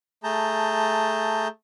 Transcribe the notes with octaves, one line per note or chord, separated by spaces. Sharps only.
A3 G#4 A5 A#5 G6